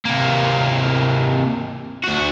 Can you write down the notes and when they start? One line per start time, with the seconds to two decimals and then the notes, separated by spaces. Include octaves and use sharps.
0.05 C3 A#3
2.04 D2 F#4